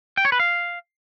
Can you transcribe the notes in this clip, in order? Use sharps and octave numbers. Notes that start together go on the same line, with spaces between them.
G5
C#5
B4
F5